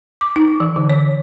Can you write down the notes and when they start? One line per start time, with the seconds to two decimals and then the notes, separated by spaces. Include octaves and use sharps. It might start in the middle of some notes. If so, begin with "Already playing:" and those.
0.21 D6
0.36 D#4
0.60 E3
0.76 D3
0.90 C#5